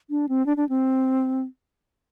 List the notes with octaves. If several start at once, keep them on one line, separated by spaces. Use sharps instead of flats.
D4
C4
D4
D4
C4